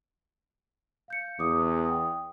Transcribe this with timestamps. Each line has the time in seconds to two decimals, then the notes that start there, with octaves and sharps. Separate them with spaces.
1.08 F5 G6 C#7
1.39 E2 D6 D#6
1.85 G5 D#6